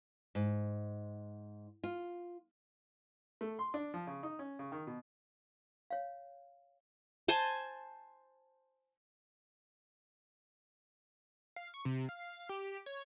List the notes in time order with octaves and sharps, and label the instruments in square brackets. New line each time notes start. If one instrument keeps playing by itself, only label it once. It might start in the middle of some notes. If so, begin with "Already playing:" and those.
[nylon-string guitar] G#2
F4
[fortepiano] A3
C6
D4
F3
C#3
D#4
C#4
C#3
D#3
B2
[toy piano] C#5 F5
[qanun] C5 G#5 A5
[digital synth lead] F5
C#6
C3
F5
G4
C#5